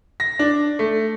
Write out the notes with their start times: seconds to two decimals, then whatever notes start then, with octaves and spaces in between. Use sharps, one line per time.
0.20 A#6
0.39 D4
0.79 A3